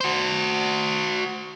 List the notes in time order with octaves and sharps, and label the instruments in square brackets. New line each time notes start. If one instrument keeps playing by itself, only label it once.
[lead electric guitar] F#4 C5